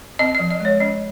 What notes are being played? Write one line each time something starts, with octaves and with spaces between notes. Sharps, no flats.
C4 D#5
D#5
F3
D#5
G#3 C#5
C#4 D#5